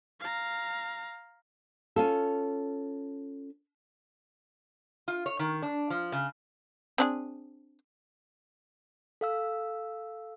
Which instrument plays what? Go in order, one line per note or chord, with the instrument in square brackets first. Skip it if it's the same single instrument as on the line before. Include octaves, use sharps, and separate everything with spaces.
[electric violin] F5 A#5
[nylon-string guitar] C#4 F4 A4
[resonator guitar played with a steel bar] F4
C#5
D#3
D4
F3
C#3
[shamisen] C4 D4 G#4
[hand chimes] A4 F5 E6